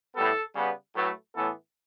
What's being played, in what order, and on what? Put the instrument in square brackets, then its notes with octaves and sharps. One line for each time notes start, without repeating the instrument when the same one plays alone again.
[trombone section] A2 G3 B3 A4
C#3 G3 B3
A2 F#3 A3 B4
A2 E3 B3 A4